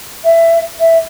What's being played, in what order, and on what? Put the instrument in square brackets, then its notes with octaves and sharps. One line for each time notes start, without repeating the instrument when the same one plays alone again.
[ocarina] E5
E5